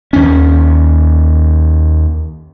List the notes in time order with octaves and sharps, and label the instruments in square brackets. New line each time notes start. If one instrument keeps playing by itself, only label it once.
[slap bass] D#2 C#4